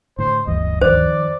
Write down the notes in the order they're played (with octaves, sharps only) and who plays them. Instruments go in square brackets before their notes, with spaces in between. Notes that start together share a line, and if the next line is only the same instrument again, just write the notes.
[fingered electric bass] A2 D3 [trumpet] C5
[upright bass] E1 [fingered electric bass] D2 G2 E3 [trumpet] D#5
[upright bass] F2 D#3 [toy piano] C5 [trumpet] D5